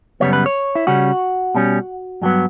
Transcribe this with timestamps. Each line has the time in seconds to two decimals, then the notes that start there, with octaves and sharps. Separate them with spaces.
0.20 F#2 C#3 E3 G3 B3 C#5
0.33 B4
0.46 C#5
0.75 E4
0.87 C#3 G3 C#4 F#4
1.55 B2 G3 C#4
2.22 G2 F#3 B3